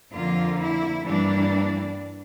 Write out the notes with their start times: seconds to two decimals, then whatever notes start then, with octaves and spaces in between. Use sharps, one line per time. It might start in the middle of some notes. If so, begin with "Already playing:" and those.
0.13 F2 D3 F3 A#3 F4
0.59 E4
1.05 G2 E3 G3 A#3 D4